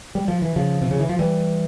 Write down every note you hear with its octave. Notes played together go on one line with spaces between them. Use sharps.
G3
F3
E3
C#3 F3
C3
C#3
E3
F3
E3 G3